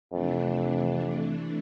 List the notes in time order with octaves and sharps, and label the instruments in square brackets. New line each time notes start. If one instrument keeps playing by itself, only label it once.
[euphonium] F2 [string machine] C3 E3 A3 D4